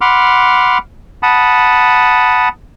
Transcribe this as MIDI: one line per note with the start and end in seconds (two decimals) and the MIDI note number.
0.01 0.78 78
0.01 0.78 83
0.01 0.78 84
0.01 0.78 86
0.01 0.78 89
1.23 2.49 78
1.23 2.49 81
1.23 2.49 83
1.23 2.49 87